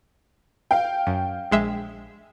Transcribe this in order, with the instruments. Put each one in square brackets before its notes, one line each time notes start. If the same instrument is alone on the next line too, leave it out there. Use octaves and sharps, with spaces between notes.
[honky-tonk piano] F5 G5
[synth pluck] F#2
A#1 G#3 E5